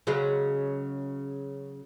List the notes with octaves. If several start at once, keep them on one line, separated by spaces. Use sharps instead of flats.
C#3 F#3 G#3